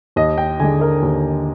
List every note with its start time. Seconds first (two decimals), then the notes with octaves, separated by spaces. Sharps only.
0.16 D#2 D#5
0.38 G5
0.60 D3 G#3 G#5
0.81 A#4
1.03 D#2